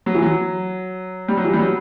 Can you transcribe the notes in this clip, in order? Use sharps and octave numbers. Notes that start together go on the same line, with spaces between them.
F#3
E3
F#3
G3
F#3
E3
G3
F#3